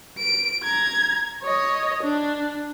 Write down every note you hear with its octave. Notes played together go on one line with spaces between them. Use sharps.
D7
A#5 G#6
C#5 D#5
D4